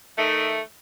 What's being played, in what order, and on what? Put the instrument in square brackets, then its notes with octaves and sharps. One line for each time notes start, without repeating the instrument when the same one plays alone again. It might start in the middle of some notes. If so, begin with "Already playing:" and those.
[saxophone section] D#3 A3